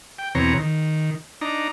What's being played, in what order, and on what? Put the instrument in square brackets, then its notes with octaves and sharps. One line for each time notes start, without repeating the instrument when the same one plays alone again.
[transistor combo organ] G5
E2 B2 C4 C#5 A#5
D#3
D4 D#4 A#5